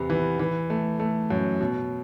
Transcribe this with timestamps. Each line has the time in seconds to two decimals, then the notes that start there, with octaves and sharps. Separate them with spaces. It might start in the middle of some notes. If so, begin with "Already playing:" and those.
Already playing: E2 C3 B3
0.10 E3
0.39 E3
0.70 A3
1.00 A3
1.30 F#2
1.61 B2